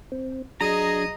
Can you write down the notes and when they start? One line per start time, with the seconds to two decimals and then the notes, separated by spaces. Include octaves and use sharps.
0.12 C4
0.61 F#3 D4 G#4 D#5 A#5